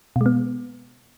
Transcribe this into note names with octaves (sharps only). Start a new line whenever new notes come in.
B2 G#3 B3